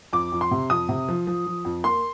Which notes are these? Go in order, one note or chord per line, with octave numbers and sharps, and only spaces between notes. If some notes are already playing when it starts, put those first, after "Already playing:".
F2 D6
F2
C6
C3
F2 D#6
C3
F3
F3
F3
F2
A#3 C6